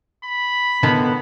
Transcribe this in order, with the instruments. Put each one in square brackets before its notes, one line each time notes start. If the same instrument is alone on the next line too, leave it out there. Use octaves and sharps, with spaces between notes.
[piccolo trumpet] B5
[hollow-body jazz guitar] A2 D3 D#3 [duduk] B3